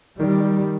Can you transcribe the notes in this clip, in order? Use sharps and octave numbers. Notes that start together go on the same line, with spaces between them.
D#3 G3